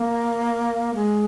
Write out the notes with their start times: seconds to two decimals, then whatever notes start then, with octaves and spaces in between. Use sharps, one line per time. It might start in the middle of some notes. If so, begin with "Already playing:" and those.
Already playing: A#3
0.94 G#3